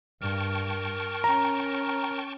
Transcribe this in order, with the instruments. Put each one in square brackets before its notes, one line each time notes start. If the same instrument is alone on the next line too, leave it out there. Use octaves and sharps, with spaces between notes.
[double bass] G2 [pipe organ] A#4 [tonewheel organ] G5 A5 C#6
[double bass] C#4 [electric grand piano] A#5